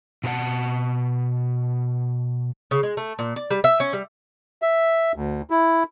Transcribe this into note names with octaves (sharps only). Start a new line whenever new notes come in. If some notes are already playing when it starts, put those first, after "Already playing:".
B2 G4 A#4 F#5 A5
C#3
G#3
A3
A#2
D5
G3
E5
C#4
G3
E5
D2
E4